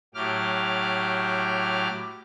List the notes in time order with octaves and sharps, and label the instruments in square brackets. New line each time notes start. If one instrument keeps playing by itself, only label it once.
[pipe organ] A2 F#3 G4 D6 F6